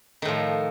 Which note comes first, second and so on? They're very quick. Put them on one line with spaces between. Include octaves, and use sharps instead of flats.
D#3 A2 F3